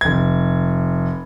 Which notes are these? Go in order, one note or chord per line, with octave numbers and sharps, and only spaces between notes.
F1 G#6